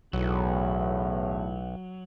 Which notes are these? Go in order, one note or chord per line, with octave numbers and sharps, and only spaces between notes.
B1 E2 A2 F#3